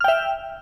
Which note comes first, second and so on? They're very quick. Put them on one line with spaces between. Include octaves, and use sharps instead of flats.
F6 G5 E5